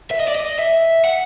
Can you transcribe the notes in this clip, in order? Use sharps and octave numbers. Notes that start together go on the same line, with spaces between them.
E5
D#5
D5
D#5
E5
F#5